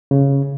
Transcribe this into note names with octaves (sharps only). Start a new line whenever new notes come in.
C#3